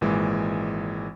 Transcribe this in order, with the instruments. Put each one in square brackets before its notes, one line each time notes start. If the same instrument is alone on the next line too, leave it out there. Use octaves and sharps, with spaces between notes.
[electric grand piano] G#1 A#2 E3 G#3